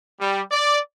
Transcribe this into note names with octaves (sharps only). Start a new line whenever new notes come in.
G3
D5